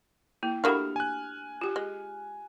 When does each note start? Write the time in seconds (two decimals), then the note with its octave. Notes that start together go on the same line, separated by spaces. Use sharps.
0.43 A#3 E4
0.64 A3 A#3 D4 F#4 G4 B5 F6
0.96 G#5 F#6
1.61 F4 G4
1.76 G#3